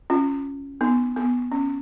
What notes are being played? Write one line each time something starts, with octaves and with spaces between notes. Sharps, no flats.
C#4 F4
B3 D#4
B3
C#4